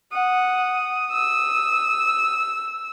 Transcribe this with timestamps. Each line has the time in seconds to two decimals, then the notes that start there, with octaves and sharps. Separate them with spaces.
0.12 F#5 D#6
1.12 E6